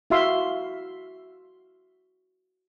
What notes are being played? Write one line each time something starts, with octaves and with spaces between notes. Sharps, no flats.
E4 F#4 E5 F5 C6